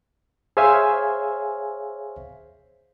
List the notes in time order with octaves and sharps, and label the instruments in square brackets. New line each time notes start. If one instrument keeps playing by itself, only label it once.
[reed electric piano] G#4 C5 C#5 E5 F5 G#5